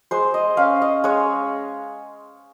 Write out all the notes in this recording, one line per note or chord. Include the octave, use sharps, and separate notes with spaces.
G#3 C5
D#5
C#4 F5
D#5
G#3 C#5